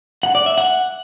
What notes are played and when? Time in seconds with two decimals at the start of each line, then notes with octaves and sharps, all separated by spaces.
0.23 F#5
0.35 D5
0.46 E5
0.58 F#5